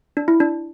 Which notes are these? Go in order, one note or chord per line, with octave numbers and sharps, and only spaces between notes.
D4
E4
D4